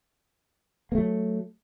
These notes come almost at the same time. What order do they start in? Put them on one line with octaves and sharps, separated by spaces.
A#3 A3 F#3